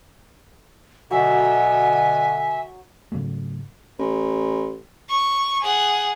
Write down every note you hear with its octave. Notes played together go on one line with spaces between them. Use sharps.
B2 D3 F#3 E5 G#5
G#2 C#3 F#3 A3
A1
C#6
G#4 F#5